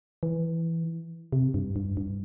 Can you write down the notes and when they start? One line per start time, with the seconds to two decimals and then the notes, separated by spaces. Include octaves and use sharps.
0.23 E3
1.32 C3
1.54 G2
1.76 G2
1.97 G2